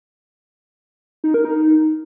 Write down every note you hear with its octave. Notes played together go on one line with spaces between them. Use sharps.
D#4
A#4
D#4